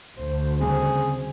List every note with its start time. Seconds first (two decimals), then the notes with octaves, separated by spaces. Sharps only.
0.17 D2 C5
0.61 C#3 G3 C4 G#4